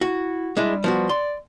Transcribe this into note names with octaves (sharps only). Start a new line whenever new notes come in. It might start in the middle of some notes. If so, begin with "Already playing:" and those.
E4 F#4
G3 G#3 D4 E4
F3 B3 F#4
D5 C6